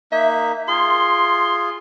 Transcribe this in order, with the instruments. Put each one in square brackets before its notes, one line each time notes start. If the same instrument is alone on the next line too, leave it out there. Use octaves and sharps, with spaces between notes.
[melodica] A#3 D#4 [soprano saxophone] E5
[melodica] F4 G#4 [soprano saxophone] C6